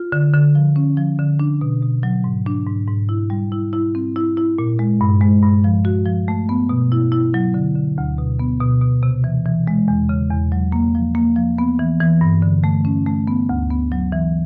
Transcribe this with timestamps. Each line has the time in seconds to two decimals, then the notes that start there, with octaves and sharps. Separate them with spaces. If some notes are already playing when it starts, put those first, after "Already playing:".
Already playing: F4
0.12 D3
0.34 D3
0.55 F3
0.76 C#4
0.97 F3
1.19 D3
1.40 D4
1.61 B2
1.82 B2
2.03 F#3
2.24 G#2
2.46 D4
2.67 G#2
2.88 G#2
3.09 E4
3.30 G3
3.52 E4
3.73 E4
3.95 C4
4.16 E4
4.37 E4
4.58 A#2
4.79 G#3
5.01 G2
5.21 G#3
5.43 G2
5.64 F3
5.85 F#4
6.06 F3
6.28 A3
6.49 B3
6.69 B2
6.92 E4
7.12 E4
7.34 F#3
7.54 D3
7.76 D3
7.98 D2
8.18 B2
8.39 B3
8.60 B2
8.82 B2
9.03 C3
9.24 E3
9.46 E3
9.67 G#3
9.88 E2
10.09 C#3
10.31 E2
10.52 F#3
10.72 A#3
10.95 F3
11.15 A#3
11.36 F3
11.58 B3
11.79 E3
12.00 E3
12.21 G2
12.42 D3
12.64 A3
12.85 C#4
13.07 A3
13.27 B3
13.49 D2
13.71 B3
13.92 F#3
14.12 E3